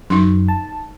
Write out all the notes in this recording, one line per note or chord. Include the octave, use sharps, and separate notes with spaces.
F#2 D#4 C6
A5